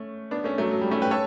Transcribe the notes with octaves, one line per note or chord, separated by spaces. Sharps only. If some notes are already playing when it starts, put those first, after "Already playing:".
Already playing: A3 C#4
B3 D4
A3 C#4
F#3 A3
F#3
G3
A3 C#4
G4 B4
A4 C#5